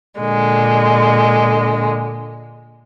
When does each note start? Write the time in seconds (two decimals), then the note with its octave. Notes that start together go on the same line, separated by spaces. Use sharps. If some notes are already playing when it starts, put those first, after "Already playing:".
0.20 A#2 D3 G#3